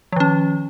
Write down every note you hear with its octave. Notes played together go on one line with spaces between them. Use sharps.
D#3 F3 C#4